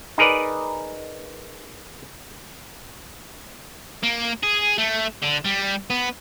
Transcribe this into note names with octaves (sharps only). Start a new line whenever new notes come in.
D#4 G#4 A#4 B4 D5
A#3
G#4
A3
D3
G3
B3